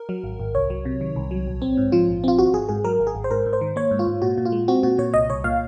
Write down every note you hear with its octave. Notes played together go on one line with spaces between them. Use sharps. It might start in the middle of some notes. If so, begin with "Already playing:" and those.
Already playing: A#4
F#3
G#1
G#1
C2 C#5
F#3
C3
D#3
C2
F#3
A#1
C4
G#2
F3 F4
A#1
C4 F4
G#1 F#4
G#1 G#4
G#2 G#4
F#3 A#4
G#1
G#4
G#1
C5
G#2 A#4
G#2
C5
D#3
A#3 C#5
G#2
F4
G#2
A#2 F#4
A#2
F4
G#3
C4 F#4
A#2 F#4
A#2 C#5
C2 D#5
C2 C#5
A#2 F5